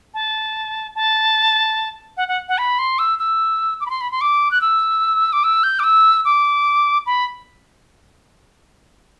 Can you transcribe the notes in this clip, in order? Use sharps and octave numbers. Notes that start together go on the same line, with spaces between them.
A5
A5
F#5
F#5
F#5
B5
C6
E6
E6
D6
B5
C6
B5
C6
D6
F#6
E6
D6
E6
G6
D6
E6
D6
B5